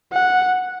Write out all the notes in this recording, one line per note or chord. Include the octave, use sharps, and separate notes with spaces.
F#5